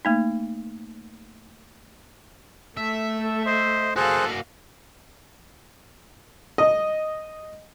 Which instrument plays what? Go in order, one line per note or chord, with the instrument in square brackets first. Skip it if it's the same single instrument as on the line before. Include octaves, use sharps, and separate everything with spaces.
[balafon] A3 A#3 D#4
[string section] A3 [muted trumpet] A4 [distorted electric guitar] E5
[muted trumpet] C5 [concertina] D#5
[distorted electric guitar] A#3 F#4 [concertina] G#4 C5 F#6 [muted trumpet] A4 [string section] F5
[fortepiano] D#5